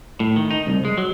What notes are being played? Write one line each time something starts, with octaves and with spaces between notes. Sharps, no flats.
A2
D#3
D#4
C2
G#3
F#3